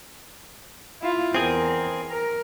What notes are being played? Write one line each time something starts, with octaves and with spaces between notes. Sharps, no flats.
E4 F4
E2 C4 G#4 A#4
A#4